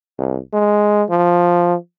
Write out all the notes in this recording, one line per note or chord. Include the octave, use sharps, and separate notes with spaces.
C2
G#3
F3